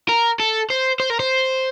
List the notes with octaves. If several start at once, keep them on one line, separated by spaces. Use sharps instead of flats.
A#4
A4
C5
C5
A#4
C5